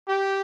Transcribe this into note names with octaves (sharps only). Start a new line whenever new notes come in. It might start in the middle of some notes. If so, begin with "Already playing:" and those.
G4